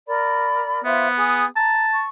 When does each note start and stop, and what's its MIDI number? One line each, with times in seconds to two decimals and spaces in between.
0.07 0.83 70
0.07 0.83 74
0.07 0.83 83
0.84 1.44 59
0.84 1.07 65
0.84 1.07 72
0.84 1.07 76
1.15 1.44 68
1.15 1.44 87
1.56 2.05 81
1.56 1.87 82
1.91 2.09 85